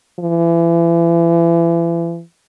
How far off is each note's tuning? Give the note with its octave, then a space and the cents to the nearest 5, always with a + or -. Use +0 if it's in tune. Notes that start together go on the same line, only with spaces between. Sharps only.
E3 +35